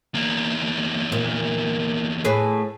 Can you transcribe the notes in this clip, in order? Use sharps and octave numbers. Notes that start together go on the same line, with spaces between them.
E2 A#3
A#2
A2 G#4 B4